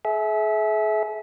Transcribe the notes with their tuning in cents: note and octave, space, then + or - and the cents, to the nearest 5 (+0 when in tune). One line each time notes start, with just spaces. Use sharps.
G#4 +40 E5 -15